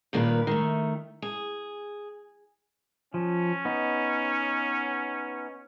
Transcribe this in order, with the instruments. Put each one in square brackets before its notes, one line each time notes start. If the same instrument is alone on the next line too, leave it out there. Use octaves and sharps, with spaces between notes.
[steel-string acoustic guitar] G2 A#2 D#3 A#4 B4
D#3 A3
G#4
[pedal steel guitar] F3 [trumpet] C#4
[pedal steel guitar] B3 D#4